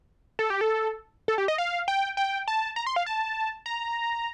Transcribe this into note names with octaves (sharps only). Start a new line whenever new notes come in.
A4
G4
A4
A4
G4
D#5
F5
G5
G5
A5
A#5
C6
F5
A5
A#5